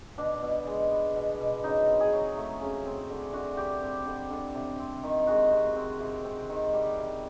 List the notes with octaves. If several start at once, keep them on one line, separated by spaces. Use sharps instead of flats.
B2 D4
B2
G#3
B3
B2
B2
C#3 D#4
C4
G#4
F#3
A3
C#3
C4
D3
D3 F#4
G3 G4
C4
D3
D3
C3
C4
D#3
G#3 F#4
C3
C4
C3
C4
D#3
G3
C3